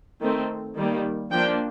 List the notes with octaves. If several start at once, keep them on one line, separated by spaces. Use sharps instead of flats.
D#3 A3 C4
D#3 G3 A#3
F3 A#3 D4 G5